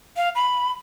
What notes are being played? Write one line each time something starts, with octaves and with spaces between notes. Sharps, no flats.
F5
B5